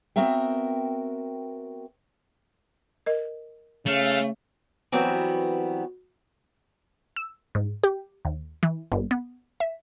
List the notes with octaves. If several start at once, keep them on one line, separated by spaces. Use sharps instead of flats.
B3 C4 F#4 A#4 E5 G5
A#4 D#5
C#3 A3 F5
E3 F#3 G3 B3 C4 F#4
E6
G#2
G4
D#2
E3
G1
B3
E5